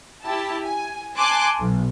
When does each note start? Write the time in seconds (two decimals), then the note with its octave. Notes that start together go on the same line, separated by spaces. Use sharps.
0.22 E4 G4 A5
0.65 G#5
1.15 G#5 A5 C6 D6 F#6
1.60 B1